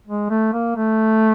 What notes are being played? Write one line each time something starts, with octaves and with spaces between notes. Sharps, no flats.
G#3
A3
A#3
A3